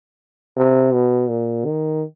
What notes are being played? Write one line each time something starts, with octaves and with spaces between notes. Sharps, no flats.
C3
B2
A#2
D#3